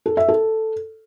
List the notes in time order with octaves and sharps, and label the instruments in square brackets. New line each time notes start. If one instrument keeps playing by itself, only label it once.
[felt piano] A4
E5
A4